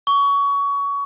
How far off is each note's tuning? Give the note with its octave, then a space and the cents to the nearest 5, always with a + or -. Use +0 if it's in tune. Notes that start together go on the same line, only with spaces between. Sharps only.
C#6 +25